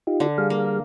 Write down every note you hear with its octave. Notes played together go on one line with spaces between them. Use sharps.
D#4 F4 G4
D3
G3 G#4 F5
A#3